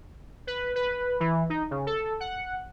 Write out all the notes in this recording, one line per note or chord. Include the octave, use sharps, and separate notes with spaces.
B4
B4
E3
D#4
C#3
A4
F#5